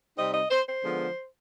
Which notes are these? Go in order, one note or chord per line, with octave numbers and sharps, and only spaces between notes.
C3 G3 C4 D#4 D#5
D#5
C5
C5
D3 F3 G#3 B3